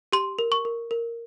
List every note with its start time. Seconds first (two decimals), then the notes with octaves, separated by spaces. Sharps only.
0.13 G4 C6
0.39 A#4
0.52 C#6
0.65 A#4
0.91 A#4